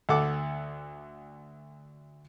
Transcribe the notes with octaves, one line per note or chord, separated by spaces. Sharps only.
D2 A4 F#5 D6